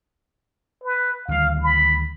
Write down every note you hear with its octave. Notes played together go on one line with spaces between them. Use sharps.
B4
D2 D#3 G3 F5
B5